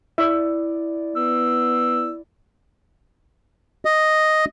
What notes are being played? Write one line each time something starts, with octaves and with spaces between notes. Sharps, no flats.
E4 D5 E5
B3 E6
D#5